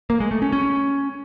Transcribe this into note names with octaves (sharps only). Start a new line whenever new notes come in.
A#3
G#3
A3
C#4
C#4